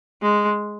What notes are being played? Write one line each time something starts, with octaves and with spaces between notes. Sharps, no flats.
G#3